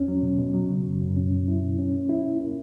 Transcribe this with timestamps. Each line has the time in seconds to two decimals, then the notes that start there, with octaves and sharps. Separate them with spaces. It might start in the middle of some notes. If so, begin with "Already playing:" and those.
Already playing: E2 C#4
0.08 F#3
0.23 B2
0.39 B2
0.54 F#3
0.69 C#3
0.86 F#2
1.01 F#2
1.17 C#4
1.31 F#3
1.48 E4
1.63 B2
1.79 C#4
1.94 A#3
2.09 E4
2.25 B2
2.41 A#3